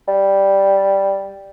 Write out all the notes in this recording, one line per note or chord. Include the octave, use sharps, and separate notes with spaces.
G3